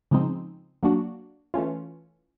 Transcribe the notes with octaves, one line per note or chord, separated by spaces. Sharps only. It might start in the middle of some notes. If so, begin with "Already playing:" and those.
C#3 F3 G#3 C4 D#4
F#3 A#3 D4 F#4
E3 A3 C#4 F4